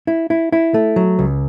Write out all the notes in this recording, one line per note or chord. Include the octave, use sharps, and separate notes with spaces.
E4
E4
E4
A3
F#3
C#2